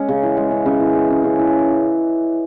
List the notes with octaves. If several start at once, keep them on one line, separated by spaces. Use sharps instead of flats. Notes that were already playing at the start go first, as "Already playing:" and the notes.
Already playing: G#3 C#4
C#3
E3
G#3
C#4
C#3
E3
G#3
C#4
C#3
E3